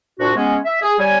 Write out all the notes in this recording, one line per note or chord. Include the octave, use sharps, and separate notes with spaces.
C2 A#2 D4 F#4
G#3 B3 C#4
E5
G#4
G3 C#5 G#5